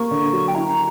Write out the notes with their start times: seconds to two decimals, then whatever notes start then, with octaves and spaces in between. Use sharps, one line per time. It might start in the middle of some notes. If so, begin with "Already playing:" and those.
Already playing: A#3 C#6
0.11 D3
0.33 F#3
0.48 G5
0.55 E4 A#5